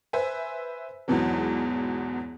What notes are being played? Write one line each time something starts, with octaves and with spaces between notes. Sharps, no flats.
B4 C5 E5 G#5
E2 G#2 B2 E3 F#3